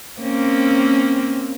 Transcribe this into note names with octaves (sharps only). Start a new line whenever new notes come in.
A#3 C4 C#4